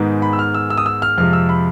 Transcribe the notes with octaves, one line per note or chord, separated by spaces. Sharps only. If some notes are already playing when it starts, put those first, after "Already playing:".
Already playing: G#2 D#3 G#3 B3
B5
E6
F6
E6
E6
D#6
E6
F6
F2 C3 F3 G#3 F6
E6
B5